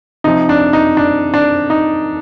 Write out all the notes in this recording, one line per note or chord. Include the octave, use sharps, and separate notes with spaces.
C3 F3 D#4
D4
D#4
D4
D4
D#4